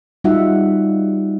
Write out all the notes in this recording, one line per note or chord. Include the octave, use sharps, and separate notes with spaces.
G3 D#4 F4 F#4 E5 F#5